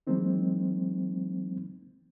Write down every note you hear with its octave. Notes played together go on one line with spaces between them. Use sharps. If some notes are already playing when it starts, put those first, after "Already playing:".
E3 F#3 G#3 A#3 C4 D#4